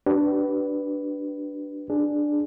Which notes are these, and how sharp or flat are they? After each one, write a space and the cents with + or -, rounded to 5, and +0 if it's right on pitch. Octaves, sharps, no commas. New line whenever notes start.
D4 +0 G4 -45 B4 +0
D4 +10 G#4 +5